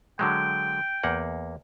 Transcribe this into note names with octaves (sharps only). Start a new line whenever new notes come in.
D3 F#3 G#3 G5
E2 A#3 F#5